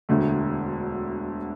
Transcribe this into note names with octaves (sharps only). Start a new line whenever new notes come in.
E1 D2 D3 A3